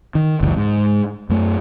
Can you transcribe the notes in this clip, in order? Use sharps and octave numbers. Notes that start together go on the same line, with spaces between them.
D#3
F#1 C#2 E3
G#2
F#2 A3